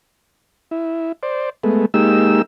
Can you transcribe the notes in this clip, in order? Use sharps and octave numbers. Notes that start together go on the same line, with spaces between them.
E4
C5 D5
G#3 A3 B3
G#3 A#3 D#4 G4 E6